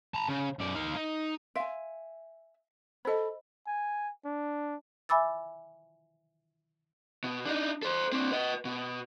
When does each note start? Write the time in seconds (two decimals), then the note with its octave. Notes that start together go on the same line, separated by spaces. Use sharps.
0.14 A5 A#5
0.29 C#3
0.59 F#2 D5
0.75 D#4 F5
0.96 D#4
1.56 E5 F5 G#5 C6
3.05 A4 C5 D#5 B5
3.67 G#5
4.25 D4
5.09 E5 G#5 B5 D6 E6 A6
7.24 B2
7.45 D4 D#4
7.83 A4 C5
8.12 C4 D4
8.32 B4 D#5
8.65 B2